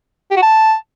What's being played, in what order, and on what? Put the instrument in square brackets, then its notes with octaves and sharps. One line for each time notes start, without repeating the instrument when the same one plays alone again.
[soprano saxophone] G4
F#4
A5